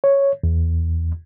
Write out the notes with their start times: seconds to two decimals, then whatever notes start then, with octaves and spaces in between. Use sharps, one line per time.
0.04 C#5
0.44 E2